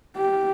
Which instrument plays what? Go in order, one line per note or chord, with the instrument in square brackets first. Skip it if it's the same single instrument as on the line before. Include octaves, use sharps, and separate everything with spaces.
[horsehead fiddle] G4